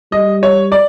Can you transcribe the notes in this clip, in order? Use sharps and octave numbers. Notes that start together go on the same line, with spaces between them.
G3 D#5
C#5
D5